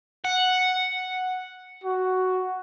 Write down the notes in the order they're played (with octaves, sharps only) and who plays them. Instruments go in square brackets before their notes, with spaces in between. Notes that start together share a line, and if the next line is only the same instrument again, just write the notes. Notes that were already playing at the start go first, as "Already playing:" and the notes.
[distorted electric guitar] F#5
[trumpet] F#4